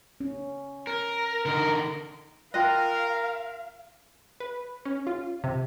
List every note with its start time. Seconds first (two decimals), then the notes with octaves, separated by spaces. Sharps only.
0.20 C#4
0.87 A#4
1.46 D3 D#4 A#4
2.54 F4 A#4 D#5 F5 G5 F#6
4.40 B4
4.85 C#4
5.07 F4
5.44 C3